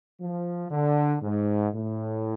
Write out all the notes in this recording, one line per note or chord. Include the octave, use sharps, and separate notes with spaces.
F3
D3
G#2
A2